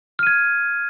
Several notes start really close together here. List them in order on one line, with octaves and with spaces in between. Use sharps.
F6 D#7 G#6